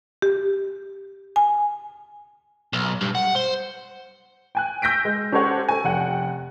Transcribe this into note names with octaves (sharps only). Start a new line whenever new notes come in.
G4
G#5
B1
G2
F#5
C5
G5 G#5 F#6
E6 G6 A#6 B6 D7
G#3
C#4 G4 A4 C5 C#5 F#5
A4 G#5
F1 F#5 G5